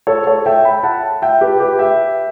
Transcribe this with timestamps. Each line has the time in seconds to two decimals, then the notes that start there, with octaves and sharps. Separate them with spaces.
0.07 A4 C#5
0.27 A4 C#5
0.46 E5 G5
0.65 G5 B5
0.83 F#5 A5
1.22 E5 G5
1.41 G4 B4
1.60 G4 B4
1.79 E5 G5